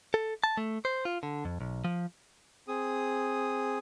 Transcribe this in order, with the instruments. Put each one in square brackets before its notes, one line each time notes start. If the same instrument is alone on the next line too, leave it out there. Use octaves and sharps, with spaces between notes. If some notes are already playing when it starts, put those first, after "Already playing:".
[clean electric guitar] A4
A5
A3
C5
F4
D3
F2
B1
F3
[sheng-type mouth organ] C4 G#4 D#6